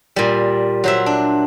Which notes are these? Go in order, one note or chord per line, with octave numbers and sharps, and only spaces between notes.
A#2 G3
F#3 C5 E5
D4